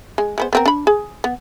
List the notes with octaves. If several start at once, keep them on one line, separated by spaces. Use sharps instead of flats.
G#3
G#3 B3 C5
B3 C4 A#4
D4 B5
G#4
B3